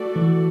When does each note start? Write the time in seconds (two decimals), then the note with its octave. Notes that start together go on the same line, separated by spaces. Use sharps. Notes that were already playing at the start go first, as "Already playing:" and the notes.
Already playing: A3 F#4 A4 D5
0.16 E3